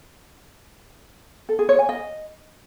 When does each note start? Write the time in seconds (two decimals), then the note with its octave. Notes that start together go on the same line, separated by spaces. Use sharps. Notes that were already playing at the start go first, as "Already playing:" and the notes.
1.49 A4
1.59 G#4
1.69 C#5
1.79 G#5
1.89 D#5